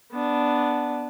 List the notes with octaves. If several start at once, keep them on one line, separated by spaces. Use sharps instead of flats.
B3 D4